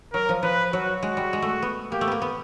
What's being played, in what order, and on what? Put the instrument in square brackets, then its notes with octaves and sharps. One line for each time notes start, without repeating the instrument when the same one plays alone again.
[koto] F#3 [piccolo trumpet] A#4
[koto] F3
[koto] F3 [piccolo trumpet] B4
[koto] F#3 [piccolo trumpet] F#4
[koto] G#3 [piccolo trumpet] F#4
[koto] G3
G#3
A3
B3
[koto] A#3 [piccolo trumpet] G4
[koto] A3
A#3 B3
B3